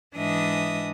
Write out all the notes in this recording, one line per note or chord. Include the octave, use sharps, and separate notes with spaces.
G#2 E3 D4 D#5 E5 D#6